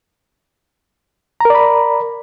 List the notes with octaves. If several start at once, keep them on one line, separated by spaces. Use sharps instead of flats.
A#4 D5 A#5 B5